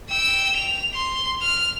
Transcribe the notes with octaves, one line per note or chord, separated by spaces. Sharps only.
G5 E6
F7
C6
F6